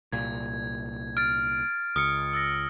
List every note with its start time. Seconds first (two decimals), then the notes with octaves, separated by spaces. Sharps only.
0.12 C2 A#2 G#6
1.17 F6 A6 D7
1.96 C#2 D#6 F6 C#7
2.33 E6 A6 A#6